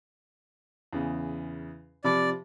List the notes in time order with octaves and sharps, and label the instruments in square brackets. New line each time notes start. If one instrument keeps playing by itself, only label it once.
[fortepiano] E2 C#3
[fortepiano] C3 F3 B5 [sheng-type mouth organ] D5